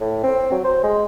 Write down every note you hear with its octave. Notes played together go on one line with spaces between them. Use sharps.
A2
C4
F#3
C5
G#3